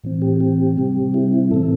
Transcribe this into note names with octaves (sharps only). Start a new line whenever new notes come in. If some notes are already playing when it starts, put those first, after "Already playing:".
A2 E3 C4
G4
G4
C3 G3 C4
E4
E4
A2 E3 C4 A4